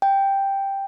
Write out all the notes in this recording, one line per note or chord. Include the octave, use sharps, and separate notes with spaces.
G5